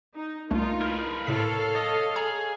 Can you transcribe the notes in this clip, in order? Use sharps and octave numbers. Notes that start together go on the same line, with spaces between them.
D#4
C2 A3 A#3 D4 D#4 F4
E4 A#4 B4
A2 C3 A4 C#5 F5 B6
D#5
G#4 A#5